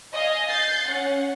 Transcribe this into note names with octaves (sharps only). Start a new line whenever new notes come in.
D#5 F5 G#5
G6 A6 C7
C#4 F#5